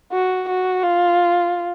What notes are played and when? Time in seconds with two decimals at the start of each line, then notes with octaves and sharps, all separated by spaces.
0.12 F#4
0.48 F#4
0.84 F4